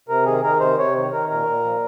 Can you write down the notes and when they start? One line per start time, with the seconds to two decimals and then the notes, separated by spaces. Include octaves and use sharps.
0.09 C3 A#4
0.26 D#3 G#4
0.43 D#3 A#4
0.60 C3 C5
0.78 C3 C#5
0.95 D#3
1.12 D#3 A#4
1.29 A#2 A#4
1.47 A#2
1.64 F3